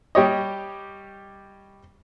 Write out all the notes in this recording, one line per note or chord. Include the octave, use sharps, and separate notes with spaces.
G3 G4 C#5 D#5